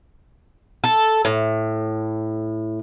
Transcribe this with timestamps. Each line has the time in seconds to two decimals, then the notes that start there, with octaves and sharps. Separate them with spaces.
0.84 A4
1.25 A2